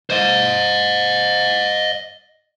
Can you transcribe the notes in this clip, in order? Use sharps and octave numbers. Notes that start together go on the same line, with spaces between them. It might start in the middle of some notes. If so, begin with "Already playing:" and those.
C5 D#5